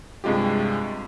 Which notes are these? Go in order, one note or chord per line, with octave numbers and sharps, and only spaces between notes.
G2 C3 G#3 F4 G4